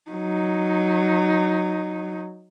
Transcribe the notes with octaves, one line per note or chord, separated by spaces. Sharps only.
F#3 D#4